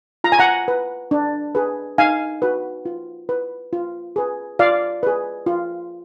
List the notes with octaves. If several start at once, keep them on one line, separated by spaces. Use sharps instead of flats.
F4 A#5
G#5
F#5 A#5
B4
D4
G#4 B4
D#4 F5 G#5
F#4 B4
F4
B4
F4
G#4 B4
F4 D5 F5
G#4 B4
F4